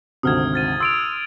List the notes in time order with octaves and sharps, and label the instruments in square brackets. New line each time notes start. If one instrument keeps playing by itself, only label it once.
[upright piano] G#1 D2 C3 [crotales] D#6 F6 G#6
[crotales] F6 A6 D#7
[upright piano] C6 [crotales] E6 D7 F7